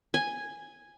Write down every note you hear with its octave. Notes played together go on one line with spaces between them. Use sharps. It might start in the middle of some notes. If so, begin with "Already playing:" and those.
G#5